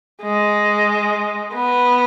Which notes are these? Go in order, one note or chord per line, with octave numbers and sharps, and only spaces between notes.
G#3
B3